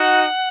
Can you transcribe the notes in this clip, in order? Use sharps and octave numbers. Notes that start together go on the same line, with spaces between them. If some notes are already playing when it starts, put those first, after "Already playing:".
Already playing: D#4 F#4 F#5